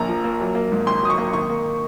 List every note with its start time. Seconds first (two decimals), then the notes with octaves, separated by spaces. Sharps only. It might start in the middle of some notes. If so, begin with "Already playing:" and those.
Already playing: A#1 A#2 A#3 A#5
0.09 F3
0.24 A#3
0.40 F#3
0.55 A#3
0.72 G#2
0.87 G#1 C6
1.03 F#3 D#6
1.10 C#6
1.18 A#3
1.33 D#3 C#6
1.50 A#3